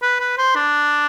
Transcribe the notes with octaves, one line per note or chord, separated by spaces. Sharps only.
B4
B4
C5
D4